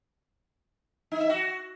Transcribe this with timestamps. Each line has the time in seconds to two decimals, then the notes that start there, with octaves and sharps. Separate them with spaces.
1.12 D#4
1.20 E5
1.29 F#4